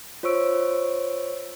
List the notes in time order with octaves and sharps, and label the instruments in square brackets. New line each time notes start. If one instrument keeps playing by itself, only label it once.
[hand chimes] F4 C5 C#5 C#6 E6 D7